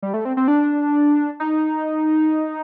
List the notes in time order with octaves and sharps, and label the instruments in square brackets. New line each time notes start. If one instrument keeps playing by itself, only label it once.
[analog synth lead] G3
A3
C4
C4
D4
D#4